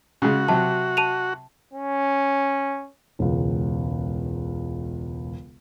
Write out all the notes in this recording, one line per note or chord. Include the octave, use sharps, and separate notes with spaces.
C#3 G#3 F#4
C3 F#3 A5
A5 D#7 F7
C#4
E1 C#2